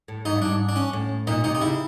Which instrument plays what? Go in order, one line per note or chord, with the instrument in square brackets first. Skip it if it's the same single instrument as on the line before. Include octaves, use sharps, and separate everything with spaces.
[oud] A2
[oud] G#2 [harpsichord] D#4
[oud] G2
[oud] G#2 [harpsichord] D4
[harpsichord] D4
C#4
[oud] A2
[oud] A#2 [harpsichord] D#4
[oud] C3 [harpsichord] D#4
[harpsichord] D#4
[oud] C#3 [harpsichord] E4